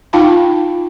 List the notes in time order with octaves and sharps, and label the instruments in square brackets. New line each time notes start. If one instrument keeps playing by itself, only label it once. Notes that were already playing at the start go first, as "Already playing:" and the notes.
[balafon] D#4 F4 F5 G5 A5 B5